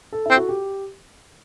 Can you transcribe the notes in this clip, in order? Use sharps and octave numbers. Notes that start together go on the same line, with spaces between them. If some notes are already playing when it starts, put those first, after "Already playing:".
A4
C4 E4
F#4
G4